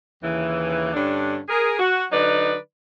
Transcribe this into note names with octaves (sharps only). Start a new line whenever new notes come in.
D#2 C#3 E3
G2 D3 C#4 D4
G#4 A#4
F#4
D3 F#3 D#4 B4 D5